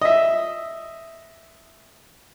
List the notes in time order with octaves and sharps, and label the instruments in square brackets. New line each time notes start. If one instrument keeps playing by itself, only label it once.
[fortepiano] D#5 E5